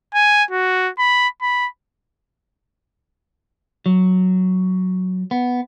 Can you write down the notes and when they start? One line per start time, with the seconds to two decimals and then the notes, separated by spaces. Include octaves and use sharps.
0.14 G#5
0.51 F#4
0.98 B5
1.42 B5
3.86 F#3
5.31 B3